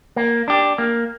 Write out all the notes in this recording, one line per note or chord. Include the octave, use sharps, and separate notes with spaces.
A#3
D4 G4
A#3